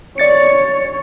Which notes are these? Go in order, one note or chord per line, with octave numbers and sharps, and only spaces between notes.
C#5 D5 A6 C#7